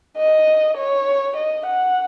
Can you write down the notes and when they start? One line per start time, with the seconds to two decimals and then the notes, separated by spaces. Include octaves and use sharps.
0.18 D#5
0.77 C#5
1.36 D#5
1.66 F#5